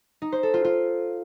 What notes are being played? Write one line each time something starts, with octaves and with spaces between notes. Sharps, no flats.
D#4
C5
A4
F4
F4